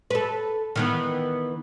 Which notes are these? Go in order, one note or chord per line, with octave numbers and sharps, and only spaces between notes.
A4 B4
D#3 E3 B3